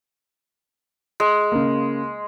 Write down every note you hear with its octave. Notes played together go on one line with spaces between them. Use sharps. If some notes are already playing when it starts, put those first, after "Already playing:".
G#3
C#3 A#3